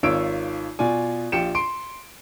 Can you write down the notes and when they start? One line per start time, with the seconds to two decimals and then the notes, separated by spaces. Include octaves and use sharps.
0.03 G#1 D#4 F4 C#5 E6 D7
0.79 B2 F4 D5 G#5
1.32 A#1 F4 G4 G5 C#7 E7
1.55 C6 D7